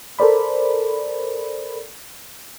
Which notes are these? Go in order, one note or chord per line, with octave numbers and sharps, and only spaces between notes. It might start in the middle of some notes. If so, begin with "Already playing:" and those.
A4 A#4 C5 D5 B5